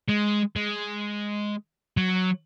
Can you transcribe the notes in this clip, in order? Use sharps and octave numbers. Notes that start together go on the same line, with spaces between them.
G#3
G#3
F#3